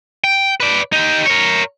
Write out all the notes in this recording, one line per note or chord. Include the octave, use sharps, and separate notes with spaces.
G5
B4 D5
D#4 G4
A#4 C#5